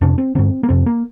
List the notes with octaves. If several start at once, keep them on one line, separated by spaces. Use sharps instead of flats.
F2 C3 D4
C4
G2 D3 C4
A#3
F2 C3 C4
A#3